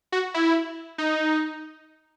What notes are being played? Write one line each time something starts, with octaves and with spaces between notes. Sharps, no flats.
F#4
E4
D#4